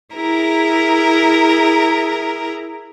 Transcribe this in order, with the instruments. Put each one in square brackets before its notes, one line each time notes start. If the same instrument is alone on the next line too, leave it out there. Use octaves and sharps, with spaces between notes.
[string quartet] E4 G#4 A#4 A#5